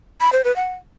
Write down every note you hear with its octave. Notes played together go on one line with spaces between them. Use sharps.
B5
C5
B4
F#5